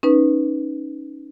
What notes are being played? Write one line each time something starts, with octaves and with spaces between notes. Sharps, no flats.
C#4 D#4 B4